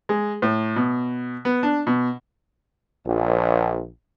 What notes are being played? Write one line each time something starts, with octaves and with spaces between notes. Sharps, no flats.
G#3
A2
B2
B3
D4
B2
A#1